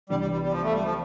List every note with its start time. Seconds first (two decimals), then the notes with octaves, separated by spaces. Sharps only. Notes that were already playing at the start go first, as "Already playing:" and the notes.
0.10 C2 C3 E3 G3 B3 D4
0.20 G3
0.31 G3
0.41 G3
0.51 F3
0.63 A3
0.72 G3
0.83 F3